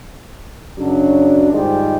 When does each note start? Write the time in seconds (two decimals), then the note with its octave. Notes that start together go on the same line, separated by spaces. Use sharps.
0.79 F#2 C#3 F#3 D4
1.51 G#2 D#3 F3 G3 G#3